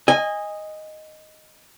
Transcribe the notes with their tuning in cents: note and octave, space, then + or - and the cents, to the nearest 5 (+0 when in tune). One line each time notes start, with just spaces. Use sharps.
D#5 +0 G#5 -25